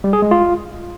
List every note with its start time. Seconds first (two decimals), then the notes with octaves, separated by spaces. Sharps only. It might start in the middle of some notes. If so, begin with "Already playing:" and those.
0.04 G3
0.13 G#4
0.22 G#3
0.31 F4